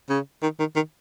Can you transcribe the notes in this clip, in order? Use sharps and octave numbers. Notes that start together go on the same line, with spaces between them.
C#3
D#3
D#3
D#3